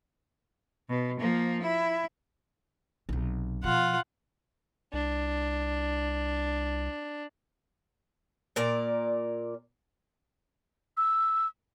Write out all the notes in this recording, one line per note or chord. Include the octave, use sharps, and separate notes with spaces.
B2
F3 A#3
E4
B1 C3
B2 F3 F4 F#5
C2 D4
A#2 A#4 D5
E6